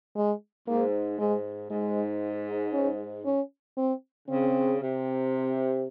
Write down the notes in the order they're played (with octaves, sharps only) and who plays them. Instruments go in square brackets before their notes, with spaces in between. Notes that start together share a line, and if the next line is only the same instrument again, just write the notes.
[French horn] G#3
[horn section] G#2 [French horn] A#3
[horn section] G#2 [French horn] G#3
[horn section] G#2 [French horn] G#3
[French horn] C#4
C#4
C4
[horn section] C#3 [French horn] C4
[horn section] C3